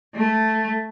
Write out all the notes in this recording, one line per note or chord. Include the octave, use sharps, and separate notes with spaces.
A3